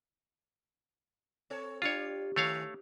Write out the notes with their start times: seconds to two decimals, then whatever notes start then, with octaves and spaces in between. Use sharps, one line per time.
1.50 C4 A4 C#5
1.82 D4 F4 G4 C#5
2.36 D#3 A3 C#5 F5